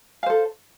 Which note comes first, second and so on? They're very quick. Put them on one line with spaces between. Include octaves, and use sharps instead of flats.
F5 C5 A4